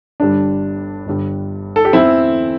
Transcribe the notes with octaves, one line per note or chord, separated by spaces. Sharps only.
G1 G2 G3 D4
G1 G2 G3
A4
G4
E2 E3 A3 C4 E4